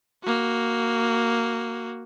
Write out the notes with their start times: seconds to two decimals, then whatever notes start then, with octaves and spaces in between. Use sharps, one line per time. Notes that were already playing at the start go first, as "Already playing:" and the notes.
0.24 A#3 F#4